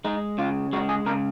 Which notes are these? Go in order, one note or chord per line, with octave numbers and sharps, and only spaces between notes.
G#3 D#4
C#3 F4
G#3 F#4
G#4
C#3 A#4